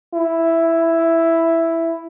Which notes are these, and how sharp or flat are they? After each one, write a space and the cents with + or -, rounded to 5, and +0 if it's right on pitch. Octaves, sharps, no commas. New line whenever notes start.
E4 +5